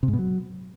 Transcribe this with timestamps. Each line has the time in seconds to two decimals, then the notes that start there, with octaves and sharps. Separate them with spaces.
0.03 C3
0.08 G#2
0.13 B2
0.19 F#3